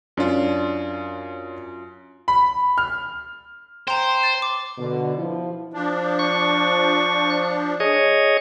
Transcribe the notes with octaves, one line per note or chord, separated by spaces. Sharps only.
F#2 C#4 D4 F4
B5
F6
C5 G5 A#5
A6
D6
B2 D3
F3 E4
F3 D4
C#6
G#4 C#5 D#5